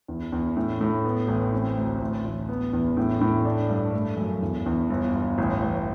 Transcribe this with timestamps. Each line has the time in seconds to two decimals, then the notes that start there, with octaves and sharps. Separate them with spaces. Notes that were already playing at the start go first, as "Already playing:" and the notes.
0.08 E2
0.32 E2
0.57 A2
0.81 A2
1.04 B3
1.28 A1
1.53 C4
1.77 D2
2.00 A1
2.25 A1
2.49 B3
2.73 E2
2.97 A2
3.21 A2
3.45 D4
3.70 G2
3.93 A3
4.17 F#2
4.42 E2
4.66 E2
4.90 G1
5.13 G1
5.38 A1
5.62 A1